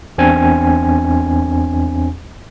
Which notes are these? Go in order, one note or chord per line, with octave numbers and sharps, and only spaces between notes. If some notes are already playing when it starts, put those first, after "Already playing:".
E2 C4 D4 G#5